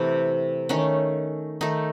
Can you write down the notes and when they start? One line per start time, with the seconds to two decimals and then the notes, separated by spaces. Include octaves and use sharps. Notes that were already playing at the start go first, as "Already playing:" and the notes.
Already playing: C3 E3 A3 C4
0.69 D#3 A3 C#4
1.61 D#3 A3 D#4